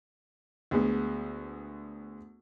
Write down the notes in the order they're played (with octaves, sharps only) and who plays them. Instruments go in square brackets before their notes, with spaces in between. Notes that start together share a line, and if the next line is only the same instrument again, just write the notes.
[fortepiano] D2 G#3 B3